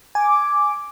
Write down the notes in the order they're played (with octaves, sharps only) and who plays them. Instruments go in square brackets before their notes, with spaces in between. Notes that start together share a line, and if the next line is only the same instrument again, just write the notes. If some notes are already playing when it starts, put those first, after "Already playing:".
[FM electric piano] G#5 [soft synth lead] D6